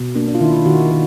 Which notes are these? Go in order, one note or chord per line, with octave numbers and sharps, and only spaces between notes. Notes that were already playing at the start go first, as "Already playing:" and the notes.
Already playing: B2
A#3 D4
D4
F4
D#3 E4
F4
D#3 F#4
D#3